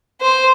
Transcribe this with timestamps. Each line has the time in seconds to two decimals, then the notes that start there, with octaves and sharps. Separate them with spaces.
0.21 C5